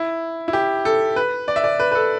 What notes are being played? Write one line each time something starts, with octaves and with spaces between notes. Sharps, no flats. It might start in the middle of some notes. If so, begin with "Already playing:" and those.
Already playing: E4
E4
G4
A4
B4
D5
E5
D5
B4
B4
A4